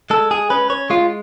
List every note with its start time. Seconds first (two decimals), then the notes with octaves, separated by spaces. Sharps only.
0.10 G#3 A4
0.31 G#4
0.50 C#4 B4
0.70 C#5
0.90 G#3 F4